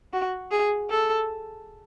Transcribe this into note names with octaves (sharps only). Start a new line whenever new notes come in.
F#4
G#4
A4